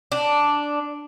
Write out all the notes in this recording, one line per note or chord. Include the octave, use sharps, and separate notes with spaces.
D4